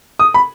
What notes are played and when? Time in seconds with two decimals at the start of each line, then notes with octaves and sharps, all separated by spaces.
0.19 D#6
0.34 B5